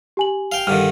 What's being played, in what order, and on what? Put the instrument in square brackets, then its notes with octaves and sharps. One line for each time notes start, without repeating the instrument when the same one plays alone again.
[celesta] G4 G#5 F#7
[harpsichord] F5 G5
[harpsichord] G2 D3 D#3 [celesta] F6